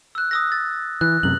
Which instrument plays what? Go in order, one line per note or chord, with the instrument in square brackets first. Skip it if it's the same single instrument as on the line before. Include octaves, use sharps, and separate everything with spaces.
[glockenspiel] E6 F#6
D#6 E6 A#6
A6
[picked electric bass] E3 [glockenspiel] F#6
[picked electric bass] F#2 C3 [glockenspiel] F#7